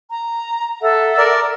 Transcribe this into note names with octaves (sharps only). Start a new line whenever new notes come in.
A#5
A4 E5 F#5
A#4 D5